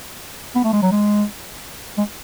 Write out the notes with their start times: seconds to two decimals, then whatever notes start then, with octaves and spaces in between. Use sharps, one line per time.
0.55 B3
0.64 A3
0.73 G#3
0.83 F#3
0.91 G#3
1.98 G#3